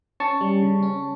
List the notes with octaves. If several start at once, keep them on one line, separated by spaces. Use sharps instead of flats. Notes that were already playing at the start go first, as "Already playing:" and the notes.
C#4 A5 C#6
G3
C#3
C#4